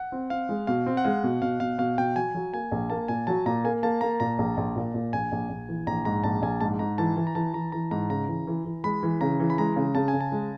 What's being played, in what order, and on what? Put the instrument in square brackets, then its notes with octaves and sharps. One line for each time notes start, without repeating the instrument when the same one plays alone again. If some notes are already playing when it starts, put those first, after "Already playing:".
Already playing: [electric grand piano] F#5
[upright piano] C4
[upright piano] C4 [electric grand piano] F5
[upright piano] G#3
[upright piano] B2 [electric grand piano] F5
[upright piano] C4
[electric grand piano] F#5
[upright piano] G#3 [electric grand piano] F5
[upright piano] B2
[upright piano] B2 [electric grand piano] F5
[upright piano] B2 [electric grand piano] F5
[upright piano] B2 [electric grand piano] F5
[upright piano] B2 [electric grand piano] G5
[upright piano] F#3 [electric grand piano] G#5
[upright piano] F#3
[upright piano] A#3 [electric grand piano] G#5
[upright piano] A#1
[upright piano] A#3 [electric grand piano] A5
[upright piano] A#2 [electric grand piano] G#5
[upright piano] F#3 [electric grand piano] A5
[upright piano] A#2 [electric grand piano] A#5
[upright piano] A#3 [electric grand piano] G#5
[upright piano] A#3 [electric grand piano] A5
[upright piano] A#3 [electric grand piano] A#5
[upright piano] A#2 [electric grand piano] A#5
[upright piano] A#1
A#1
A#2
A#2
[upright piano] A#1 [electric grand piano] G#5
[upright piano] A#1
A#1
E3
[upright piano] A#1 [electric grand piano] A#5
[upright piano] G#2 [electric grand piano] A#5
[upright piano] A#1 [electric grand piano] A5
[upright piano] A#1 [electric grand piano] G#5
[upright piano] G#2 [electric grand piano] A5
[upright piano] G#2 [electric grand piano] A#5
[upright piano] E3 [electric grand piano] A5
[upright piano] E3
[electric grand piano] A#5
[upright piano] E3 [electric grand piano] A5
[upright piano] E3 [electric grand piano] A#5
[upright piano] E3 [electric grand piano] A#5
[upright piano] G#2 [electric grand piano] A#5
[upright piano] C#3 [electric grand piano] A#5
[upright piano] E3
E3
E3
[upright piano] G#3 [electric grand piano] B5
[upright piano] E3
[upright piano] C#3 [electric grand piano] A#5
[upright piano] E3
[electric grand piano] B5
[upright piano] G#3 [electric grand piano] A#5
[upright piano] C#3
[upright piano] C#3 [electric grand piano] A5
[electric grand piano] G#5
[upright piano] C#3
[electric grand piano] A5
[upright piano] G#3